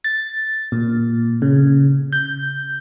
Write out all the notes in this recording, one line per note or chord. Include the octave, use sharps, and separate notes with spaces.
A6
A#2
C#3
G6